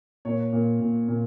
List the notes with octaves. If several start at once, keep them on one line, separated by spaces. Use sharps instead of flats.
A#2 C#5
A#2
A#2
A#2